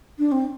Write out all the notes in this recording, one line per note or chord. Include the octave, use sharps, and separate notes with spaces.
D4
C4